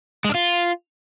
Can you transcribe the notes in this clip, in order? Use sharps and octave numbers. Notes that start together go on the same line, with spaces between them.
G#3
D4
F4